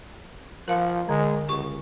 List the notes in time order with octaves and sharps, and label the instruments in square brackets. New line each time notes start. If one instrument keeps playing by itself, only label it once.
[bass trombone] F3 [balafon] A#4 F5
[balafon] D3 [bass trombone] G#3
[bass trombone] C#2 [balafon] G4 C#6